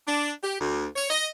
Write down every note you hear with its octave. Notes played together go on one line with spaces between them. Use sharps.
D4
G4
D2
C#5
D#5